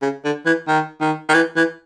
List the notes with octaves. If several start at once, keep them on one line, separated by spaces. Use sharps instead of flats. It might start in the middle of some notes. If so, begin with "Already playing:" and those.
C#3
D3
E3
D#3
D#3
D#3
E3
E3